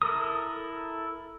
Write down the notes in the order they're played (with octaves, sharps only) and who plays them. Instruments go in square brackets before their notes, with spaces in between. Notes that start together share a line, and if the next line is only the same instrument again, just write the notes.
[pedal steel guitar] E4 A4 A#4 D#6